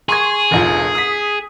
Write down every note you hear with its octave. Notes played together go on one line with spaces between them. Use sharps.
G#4 C6 C#6 G#6
F1 A#1 F4
D#6 B6